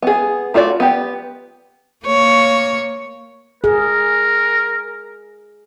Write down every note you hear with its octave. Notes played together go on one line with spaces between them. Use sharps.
B3 G#4
A3 F4 F#4 D5
B3 G4
A#3 C#5
G#4 A#4